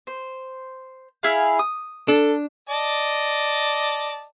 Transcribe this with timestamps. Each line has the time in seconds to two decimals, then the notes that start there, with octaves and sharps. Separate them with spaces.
0.07 C5
1.23 E4 G#4 F5
1.59 D#6
2.08 D4 A4
2.69 D5 D#5 A5